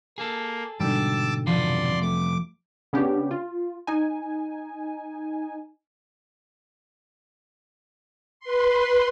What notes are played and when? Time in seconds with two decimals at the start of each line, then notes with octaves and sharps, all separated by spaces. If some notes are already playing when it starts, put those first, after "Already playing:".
0.18 A#3 G#4 A4
0.80 G#2 B2 D3 G3 A5 D6 E6
1.47 F2 C3 F3 B3 D5 C6
2.02 A3 D6
2.93 C#3 B3 C#4 D4 G4
3.31 F4
3.87 D#4 G#5
8.40 B4 C6